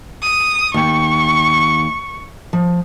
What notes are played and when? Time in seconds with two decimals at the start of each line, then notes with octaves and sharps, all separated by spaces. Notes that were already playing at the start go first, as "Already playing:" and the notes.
0.22 D#6
0.74 D#2 G5 C#6
2.53 F3